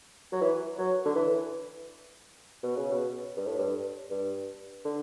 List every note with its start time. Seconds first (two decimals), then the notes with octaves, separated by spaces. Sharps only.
0.32 F#3
0.41 E3
0.78 F#3
1.05 D3
1.15 E3
2.63 B2
2.77 C#3
2.91 B2
3.37 G2
3.47 A2
3.58 G2
4.10 G2
4.85 D3